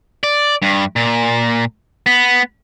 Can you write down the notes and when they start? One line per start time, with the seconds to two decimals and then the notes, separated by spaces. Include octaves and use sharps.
0.24 D5
0.62 G2
0.96 A#2
2.06 B3